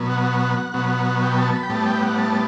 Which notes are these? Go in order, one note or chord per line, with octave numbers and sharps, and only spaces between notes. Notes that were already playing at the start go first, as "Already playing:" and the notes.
Already playing: B2 F#3 B3
F#5
B2 F#3 B3
G5
A5
B5
G5
A2 G3 B3 A5
G5
F#5
A5